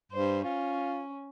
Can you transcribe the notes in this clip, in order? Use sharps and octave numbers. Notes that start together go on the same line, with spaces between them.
G2 C5
C#4 F4